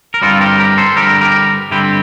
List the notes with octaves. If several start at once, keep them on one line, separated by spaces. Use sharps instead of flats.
A#4
G2 D3 G3 C4 F4 A4
G4 A#4
G4 A#4
A4 C5
G2 D3 G3 C4 G4 A#4
G4 A#4
G2 D3 G3 C4 E4 G4